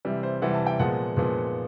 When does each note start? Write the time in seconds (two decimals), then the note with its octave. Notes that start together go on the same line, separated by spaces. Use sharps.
0.05 C3 E3 G3
0.23 C5
0.42 C3 E3 G3 F#5
0.54 A5
0.67 G5
0.79 A#2 F3 G#3 B3 F#5
1.17 A#2 F3 G#3 B3